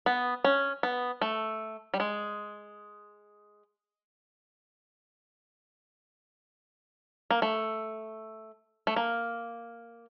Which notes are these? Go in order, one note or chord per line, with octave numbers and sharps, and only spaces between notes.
B3
C#4
B3
A3
G3
G#3
A#3
A3
A3
A#3